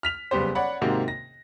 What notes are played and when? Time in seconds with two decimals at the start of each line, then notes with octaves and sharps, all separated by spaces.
0.03 F6 B6 F7
0.31 F#1 G3 B3 G4 C5
0.55 C#5 D5 F#5 B5
0.81 G#2 C3 D#3 A#3 F#4
1.08 A#6